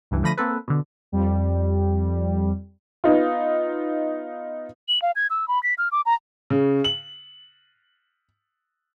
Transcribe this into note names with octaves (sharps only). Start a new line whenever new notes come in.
C#2 G2 E3
D3 F3 A3 B5 A#6 D#7
A#3 C4 A4 B4
B2 D3
F2 G3
B3 D#4 F4
F#7
F5
G#6
E6
B5
B6
F6
D6
A#5
C#3
F#7